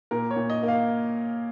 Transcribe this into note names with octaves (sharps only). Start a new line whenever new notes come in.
A#2 A#4
C#5
A#2
D#5
A#3
F5